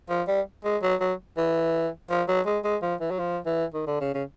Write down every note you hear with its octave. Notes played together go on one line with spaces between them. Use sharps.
F3
G3
G#3
F#3
F#3
E3
F3
F#3
G#3
G#3
F3
E3
F#3
F3
E3
D#3
D3
C#3
C#3